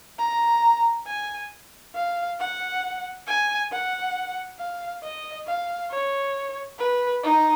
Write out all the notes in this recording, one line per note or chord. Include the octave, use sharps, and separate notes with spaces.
A#5
G#5
F5
F#5
G#5
F#5
F5
D#5
F5
C#5
B4
D#4